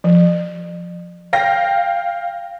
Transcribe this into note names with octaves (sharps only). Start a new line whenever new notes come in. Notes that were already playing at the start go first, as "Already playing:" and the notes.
F3
F5 G5 A#6